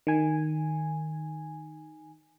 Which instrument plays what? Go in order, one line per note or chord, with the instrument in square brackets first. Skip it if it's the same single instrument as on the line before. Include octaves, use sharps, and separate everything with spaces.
[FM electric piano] D#3 G#5